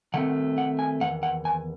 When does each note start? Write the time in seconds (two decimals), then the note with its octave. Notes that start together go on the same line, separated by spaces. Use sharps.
0.14 D#3 A3 C4 F#5
0.58 F#5
0.79 G#5
1.01 E2 D#3 F#5
1.23 F#5
1.45 G#5